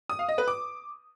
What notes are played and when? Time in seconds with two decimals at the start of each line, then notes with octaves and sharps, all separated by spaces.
0.09 D#6
0.19 F5
0.29 D#5
0.38 B4
0.48 D6